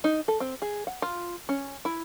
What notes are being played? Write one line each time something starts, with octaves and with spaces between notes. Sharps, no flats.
D#4
A4
C4
G#4
F#5
F4
C#4
E4